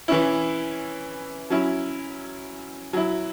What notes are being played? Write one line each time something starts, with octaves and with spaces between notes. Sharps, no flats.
E3 C#4 E4
F#3 C#4 E4
F#3 E4